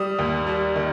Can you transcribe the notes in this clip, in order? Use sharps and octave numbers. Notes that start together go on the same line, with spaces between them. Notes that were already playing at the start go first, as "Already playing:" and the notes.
Already playing: G3 D#6
D#2
G3
D#3